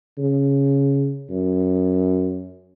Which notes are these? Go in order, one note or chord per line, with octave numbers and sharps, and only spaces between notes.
C#3
F#2